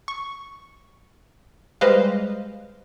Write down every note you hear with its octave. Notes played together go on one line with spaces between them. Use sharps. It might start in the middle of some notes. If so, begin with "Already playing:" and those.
C#6
G3 G#3 B4 C5 D#5 F5